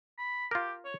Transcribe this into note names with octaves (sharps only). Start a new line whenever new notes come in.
B5
F4 G4 A#4
C#5